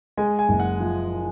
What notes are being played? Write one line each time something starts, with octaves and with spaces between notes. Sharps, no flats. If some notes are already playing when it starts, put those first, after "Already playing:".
G#3 G#5
G#5
F#1
F#5
F3